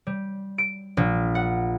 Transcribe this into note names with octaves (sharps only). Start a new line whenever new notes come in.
G3
D7
A#1
F#5